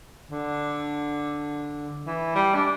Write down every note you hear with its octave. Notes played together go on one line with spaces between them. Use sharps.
D3
E3
G3
D4